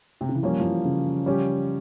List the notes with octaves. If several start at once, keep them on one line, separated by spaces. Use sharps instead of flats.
C3
C#3
E3
F3 G3 A#3 C#4
F3
E3
C#3
G3 C#4 G4